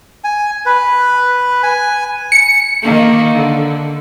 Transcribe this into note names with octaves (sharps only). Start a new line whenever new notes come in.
G#5
B4
G#5
C#7
D#3 A#3
D3